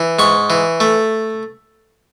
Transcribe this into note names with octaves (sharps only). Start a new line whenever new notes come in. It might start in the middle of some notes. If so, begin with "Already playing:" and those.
Already playing: E3
G#2 C#6
E3
A3